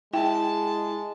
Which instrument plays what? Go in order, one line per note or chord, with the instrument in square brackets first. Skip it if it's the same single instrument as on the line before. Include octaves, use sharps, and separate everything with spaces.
[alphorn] G#3 [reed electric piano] E4 [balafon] G5 [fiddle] A5